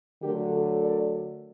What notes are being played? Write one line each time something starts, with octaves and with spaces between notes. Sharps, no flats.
D3 F#3 A3 G4 A#4
F#4 A4
A#4 D5